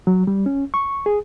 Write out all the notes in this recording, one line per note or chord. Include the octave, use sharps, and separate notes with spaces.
F#3
G3
C#4
C#6
G#4